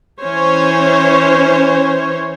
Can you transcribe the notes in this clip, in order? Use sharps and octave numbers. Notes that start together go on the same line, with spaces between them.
E3 C#4 C5 C#5